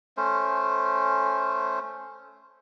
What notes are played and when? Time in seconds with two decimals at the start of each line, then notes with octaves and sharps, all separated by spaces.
0.17 A3 C#4 C5